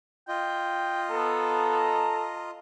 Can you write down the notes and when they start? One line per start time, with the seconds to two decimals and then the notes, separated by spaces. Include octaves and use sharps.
0.28 F4 D#5 G5
1.11 B3 A4 A#5